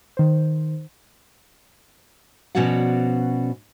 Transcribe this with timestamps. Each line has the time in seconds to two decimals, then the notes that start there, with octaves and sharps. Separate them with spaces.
0.17 D#3 C5
2.55 B2 F3 C#4 F#4 D5 F#5